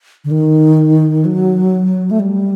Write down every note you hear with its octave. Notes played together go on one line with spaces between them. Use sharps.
D3
D#3
F#3
A3
G3